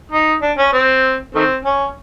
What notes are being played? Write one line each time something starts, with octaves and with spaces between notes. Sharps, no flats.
D#4
D4
C#4
C4
D#3 A3 C4
C#4